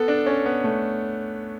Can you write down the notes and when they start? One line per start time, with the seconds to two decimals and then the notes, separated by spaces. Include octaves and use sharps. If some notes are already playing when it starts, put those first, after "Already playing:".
Already playing: B3 A4
0.08 D4
0.26 C#4
0.46 B3
0.64 A3